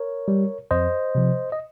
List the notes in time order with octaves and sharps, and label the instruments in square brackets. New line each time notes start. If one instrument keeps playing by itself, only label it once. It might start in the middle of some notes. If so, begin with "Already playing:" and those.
Already playing: [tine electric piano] A#4 C#5
G3
F2 C5 D#5
C3 F3
D#5